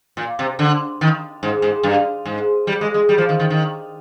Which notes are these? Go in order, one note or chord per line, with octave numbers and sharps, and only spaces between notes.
A#2
C3
D3
D#3
G#2
G#2
G2
G#2
G3
G#3
G#3
G3
F3
D#3
D#3
D#3